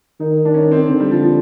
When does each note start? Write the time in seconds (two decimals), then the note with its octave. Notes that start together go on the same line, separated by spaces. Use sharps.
0.20 D#3 D#4
0.45 D4
0.54 C#4
0.72 C4
0.88 D3 C4
1.00 G3
1.11 F3
1.23 F3